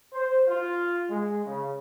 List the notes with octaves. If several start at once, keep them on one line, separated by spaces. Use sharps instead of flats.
C5
F4
G#3
C#3